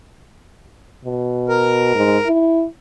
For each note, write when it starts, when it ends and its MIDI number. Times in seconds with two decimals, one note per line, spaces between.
1.05 1.94 47
1.49 2.28 70
1.95 2.17 44
2.26 2.65 64